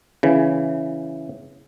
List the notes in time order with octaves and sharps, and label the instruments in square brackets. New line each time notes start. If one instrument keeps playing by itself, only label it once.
[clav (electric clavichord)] C#3 E3